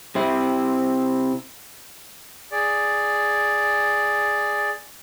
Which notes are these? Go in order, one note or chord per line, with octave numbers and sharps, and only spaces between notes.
C3 C4 E4
G#4 D5